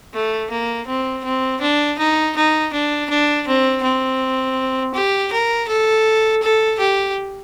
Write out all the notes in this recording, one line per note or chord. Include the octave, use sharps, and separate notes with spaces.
A3
A#3
C4
C4
D4
D#4
D#4
D4
D4
C4
C4
G4
A#4
A4
A4
G4